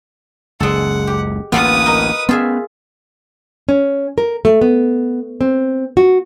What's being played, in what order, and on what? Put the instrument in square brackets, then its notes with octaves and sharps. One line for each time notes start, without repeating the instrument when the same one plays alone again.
[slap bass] F#1 C#2 [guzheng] G#3 A4 [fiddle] F#5
[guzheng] G4
[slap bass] A1 D2 A#3 [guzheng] B3 F4 A4 [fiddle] B4 D#6
[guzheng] D#4 A#4
[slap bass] B3 C#4 [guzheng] F4 G#4 E5
[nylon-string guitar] C#4
A#4
A3
B3
C4
F#4